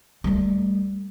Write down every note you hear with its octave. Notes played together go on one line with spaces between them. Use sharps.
G3 A3